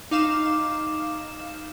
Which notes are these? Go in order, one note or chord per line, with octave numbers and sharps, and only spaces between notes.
D#4 F5 D6 E7